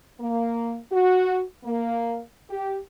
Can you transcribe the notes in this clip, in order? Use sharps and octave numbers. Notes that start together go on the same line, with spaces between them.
A#3
F#4
A#3
G4